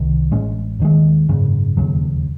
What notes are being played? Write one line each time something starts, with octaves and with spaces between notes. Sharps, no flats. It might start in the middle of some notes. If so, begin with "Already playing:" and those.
Already playing: C2 C3 D#3
A1 A2 G#3 C#4
D#2 D#3 G#3
G#1 F#2 C#3
E1 D#2 C#3 F#3